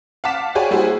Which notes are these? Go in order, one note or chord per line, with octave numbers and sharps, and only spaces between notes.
F5 F#5 A5 D6 B6 E7
F#4 G#4 C#5 D5 G5 G#5
G3 A#3 E4 F#4 G#4 C5